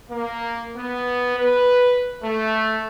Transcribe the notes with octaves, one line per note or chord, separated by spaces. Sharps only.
A#3
B3
B4
A3